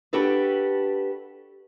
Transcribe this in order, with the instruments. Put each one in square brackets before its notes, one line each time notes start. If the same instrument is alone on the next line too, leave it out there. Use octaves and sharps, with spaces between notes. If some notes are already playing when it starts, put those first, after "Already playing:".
[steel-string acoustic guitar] D4 F#4 G4 A4 B4